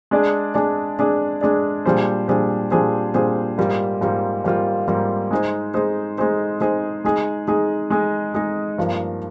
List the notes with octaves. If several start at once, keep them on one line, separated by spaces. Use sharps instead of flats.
G#3 D4 G#4 D5
G#3 D4 G#4 D5
G#3 D4 G#4 D5
G#3 D4 G#4 D5
A#2 G3 D4 G#4 C5
A#2 G3 D4 G#4 C5
A#2 G3 D4 G#4 C5
A#2 G3 D4 G#4 C5
G#2 G3 A#3 F4
G#2 G3 A#3 F4
G#2 G3 A#3 F4
G#2 G3 A#3 F4
G#3 D#4 G#4 C5
G#3 D#4 G#4 C5
G#3 D#4 G#4 C5
G#3 D#4 G#4 C5
G#3 D#4 G#4
G#3 D#4 G#4
G#3 D#4 G#4
G#3 D#4 G#4
G2 F3 A#3